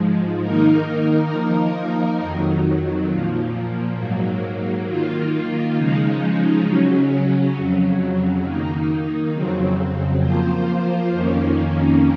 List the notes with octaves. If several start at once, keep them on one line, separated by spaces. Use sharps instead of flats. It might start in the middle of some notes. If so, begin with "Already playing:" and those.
Already playing: G#2 F3 G#3
D#3 A#3 D#4 A#4
F3 A#3 D#4 A#4
F2 D#3 F#3
A#2 F3 A#3
G#2 F#3 A#3
D#3 A#3 F4
C#3 F3 G#3 D#4
C#3 F#3 C#4
F2 C#3 F#3
D#3 A#3 D#4
F2 C#3 F#3 C4
F3 A#3 F4 C5
F2 D#3 A#3 C#4